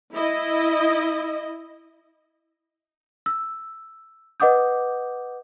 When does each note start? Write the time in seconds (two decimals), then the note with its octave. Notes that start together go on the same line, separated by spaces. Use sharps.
0.14 E4 D#5
3.26 E6
4.40 B4 D#5 F#5 D6 D#6 G6